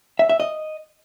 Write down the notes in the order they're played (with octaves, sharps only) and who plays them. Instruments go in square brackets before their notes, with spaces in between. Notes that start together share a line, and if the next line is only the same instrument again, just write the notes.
[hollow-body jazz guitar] E5
E5
D#5